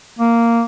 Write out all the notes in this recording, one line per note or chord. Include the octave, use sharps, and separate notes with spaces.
A#3